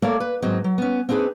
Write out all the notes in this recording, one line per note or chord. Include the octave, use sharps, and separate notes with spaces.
A3 A#3 A4 A#4 C#5 D5
B4
D#2 G#2 F#3 C4 D#5
F#3
B3 C#4
C4 D4 D#4 G#4 B4